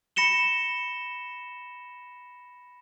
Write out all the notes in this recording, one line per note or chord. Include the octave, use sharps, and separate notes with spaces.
B5 A#6 C#7 E7 G7